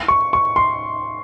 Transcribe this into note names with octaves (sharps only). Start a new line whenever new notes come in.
C#6
C#6
C6